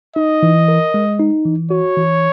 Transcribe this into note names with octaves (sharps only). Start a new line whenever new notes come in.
D#4 D#5
E3
A#4
G#3
D#4
E3
F#4 C#5
E3